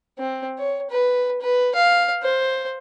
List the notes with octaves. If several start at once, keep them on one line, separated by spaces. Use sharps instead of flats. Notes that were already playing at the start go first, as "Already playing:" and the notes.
C4
C#5
B4
B4
F5
C5